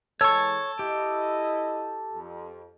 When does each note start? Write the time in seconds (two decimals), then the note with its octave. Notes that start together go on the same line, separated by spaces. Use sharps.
0.21 E3 G#3 A4 C#5 C#6
0.79 E4 G4 D#5
2.12 F2